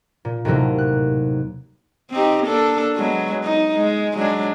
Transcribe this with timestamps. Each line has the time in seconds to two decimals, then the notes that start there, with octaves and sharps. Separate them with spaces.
0.25 A#2
0.45 D#2 A2 C3 F#3 A#3
0.78 F#6
2.11 C4 D#4 G4
2.46 A#3 D4 A4
2.96 F#3 G#3 B3
3.44 D#4
3.75 G#3
4.15 F#3 G#3 D4